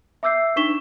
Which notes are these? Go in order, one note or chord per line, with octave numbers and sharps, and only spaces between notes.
E5 D6 E6 G6 C7
D4 D#4 C#6 B6 E7 G7